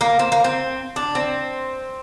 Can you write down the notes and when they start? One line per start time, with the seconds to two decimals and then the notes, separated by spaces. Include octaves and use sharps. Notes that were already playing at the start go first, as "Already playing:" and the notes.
0.01 A#3
0.19 C4
0.32 A#3
0.44 C4
0.96 D4
1.15 C4